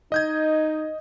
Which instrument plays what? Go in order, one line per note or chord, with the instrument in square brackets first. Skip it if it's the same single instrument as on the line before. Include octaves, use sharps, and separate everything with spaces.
[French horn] D#4 [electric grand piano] D#5 G6 G#6